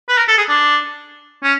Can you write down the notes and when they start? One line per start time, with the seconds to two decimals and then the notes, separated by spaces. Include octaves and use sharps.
0.09 B4
0.18 A#4
0.28 A4
0.38 G#4
0.49 D4
1.43 C#4